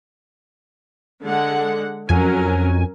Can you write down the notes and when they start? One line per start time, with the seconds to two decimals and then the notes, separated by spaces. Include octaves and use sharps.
1.23 D3 G#3 F#5
2.09 F2 F#3 C#4 A#4 G#5